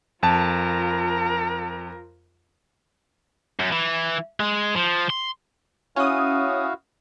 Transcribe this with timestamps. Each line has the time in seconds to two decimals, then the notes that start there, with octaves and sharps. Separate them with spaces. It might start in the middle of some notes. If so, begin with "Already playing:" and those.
0.23 F2 F4 A#4 A5
3.60 F#2
3.73 E3
4.40 G#3
4.76 F3
5.10 C6
5.96 C#4 E4 F#4 F5 D#6